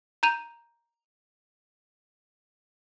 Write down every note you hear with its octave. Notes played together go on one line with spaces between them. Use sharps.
A#5 G6 D#7 F7